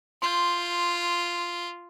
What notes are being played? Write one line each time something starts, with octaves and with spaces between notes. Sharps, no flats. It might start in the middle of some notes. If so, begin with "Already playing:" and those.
F4 C6 G6